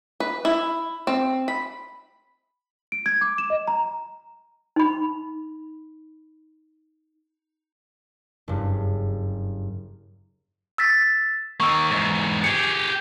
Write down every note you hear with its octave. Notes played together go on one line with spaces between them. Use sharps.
B4
E4
C4
B5
D7
G#6
D6
E7
D#5
A#5
D#4 B5
F#1 G2
E6 A6 B6
D#3 A#3 C#6 E6
E2 G#2
G4 G#4 C#7